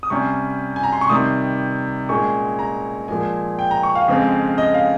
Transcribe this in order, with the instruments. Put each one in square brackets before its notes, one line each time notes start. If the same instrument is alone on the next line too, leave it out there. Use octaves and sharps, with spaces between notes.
[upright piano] D#6
C3 G3 C#4 C#6
G#5
A#5
C6
C#6
C3 D#3 G3 D#6
A#2 G#3 C#4 C#6
A#5
A#2 F3 G#3 G#5
G5
A#5
C#6
F5
F2 C#3 G#3 C4
D#5
F5